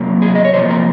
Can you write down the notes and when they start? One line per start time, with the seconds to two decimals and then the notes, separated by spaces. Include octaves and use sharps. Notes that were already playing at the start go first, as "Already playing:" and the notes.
Already playing: C3 F#3 A#3
0.22 G#4
0.35 D#5
0.45 C#5
0.54 C3 F3 A#3 C5
0.70 A#4